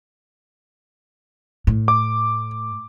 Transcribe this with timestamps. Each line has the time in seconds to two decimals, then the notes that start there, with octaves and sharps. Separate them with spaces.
1.67 A2
1.88 D6